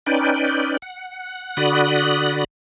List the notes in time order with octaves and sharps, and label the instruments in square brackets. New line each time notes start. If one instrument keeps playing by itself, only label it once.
[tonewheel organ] C#4 D#4 B4 D5 G5
F#5
D3 F#4 D5 B5 D#6 F#6